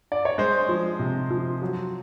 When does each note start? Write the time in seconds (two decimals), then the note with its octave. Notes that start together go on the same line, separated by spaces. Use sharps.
0.12 D5
0.25 C#5
0.38 G#3 C5
0.69 F3
0.99 C3
1.31 F3
1.62 F#3